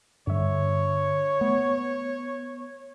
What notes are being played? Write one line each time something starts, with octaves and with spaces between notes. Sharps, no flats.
G2 D3 G3 C#5 E5
A3 B3